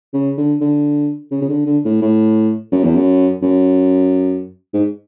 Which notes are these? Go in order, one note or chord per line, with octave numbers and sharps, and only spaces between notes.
C#3
D3
D3
C#3
C#3
D3
D3
A2
A2
F#2
E2
F#2
F#2
G#2